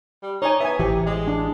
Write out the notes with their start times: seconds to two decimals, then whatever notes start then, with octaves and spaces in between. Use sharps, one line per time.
0.23 G3
0.42 D#4 C#5 D5 G#5
0.60 B3 E5 G#5
0.79 A1 C3 E3 G4
1.06 G#3
1.28 D4